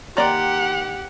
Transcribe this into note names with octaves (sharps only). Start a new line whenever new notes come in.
D#3 A#3 G4 D5 F#5 A#5 C6 D6